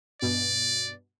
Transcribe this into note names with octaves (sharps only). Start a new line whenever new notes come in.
G2 B2 D5